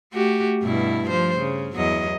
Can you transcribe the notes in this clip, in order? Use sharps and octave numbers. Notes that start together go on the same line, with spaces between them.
A3 F#4 G4
G2 B2 E4
F3 C5
C#3
E2 F#3 D#5